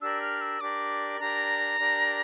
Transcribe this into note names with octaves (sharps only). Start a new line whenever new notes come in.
D4 G4 A#4 D5 E6
F6
E6
D4 G4 A#4 D5 D6
D4 G4 A#4 D5 A#5
D4 G4 A#4 D5